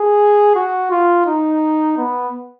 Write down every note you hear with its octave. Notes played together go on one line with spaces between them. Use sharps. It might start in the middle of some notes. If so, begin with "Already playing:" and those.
Already playing: G#4
F#4
F4
D#4
B3